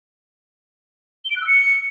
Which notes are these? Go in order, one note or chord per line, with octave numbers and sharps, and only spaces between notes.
G7
D7
F#6
E6
C#7